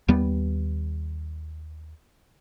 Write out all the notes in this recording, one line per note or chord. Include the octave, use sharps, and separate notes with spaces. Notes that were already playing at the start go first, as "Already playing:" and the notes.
D#2 G3 B3